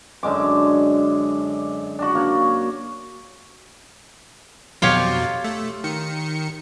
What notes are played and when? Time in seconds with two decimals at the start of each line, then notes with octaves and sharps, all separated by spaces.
0.23 F#2 D3 G#3 D6
1.99 D4 F#4
2.15 A#3 C#5
4.82 F2 B2 F#3 F4 G4 C#5
5.44 A3
5.84 D#3 C#7